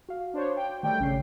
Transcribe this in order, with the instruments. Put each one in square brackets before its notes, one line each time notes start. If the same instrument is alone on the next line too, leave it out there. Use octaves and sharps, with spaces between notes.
[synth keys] F#4 F5
[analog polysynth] D4 C5 C#5
G5
[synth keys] D#3 [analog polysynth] G3 A3 G5
[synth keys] A1 C#3 C7 [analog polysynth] C#4